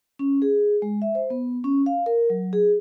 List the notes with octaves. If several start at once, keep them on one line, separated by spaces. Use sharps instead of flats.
C#4
G#4
G#3
E5
C5
B3
C#4
F5
A#4
F#3
G#4